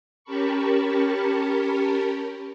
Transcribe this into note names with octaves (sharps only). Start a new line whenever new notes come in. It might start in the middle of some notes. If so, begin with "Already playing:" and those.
C#4 G4 A#4 A5 B5 C#6